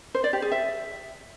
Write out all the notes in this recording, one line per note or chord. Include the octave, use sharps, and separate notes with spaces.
C5
D5
G4
G#4
E5